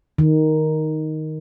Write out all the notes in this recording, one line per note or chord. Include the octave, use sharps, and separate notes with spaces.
D#3